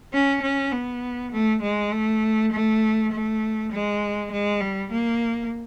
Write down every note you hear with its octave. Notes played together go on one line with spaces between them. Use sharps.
C#4
C#4
B3
A3
G#3
A3
A3
A3
G#3
G#3
G3
A#3